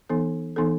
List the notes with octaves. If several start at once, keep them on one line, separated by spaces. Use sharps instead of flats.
E3 B3 D#4 A4
E3 B3 D#4 A4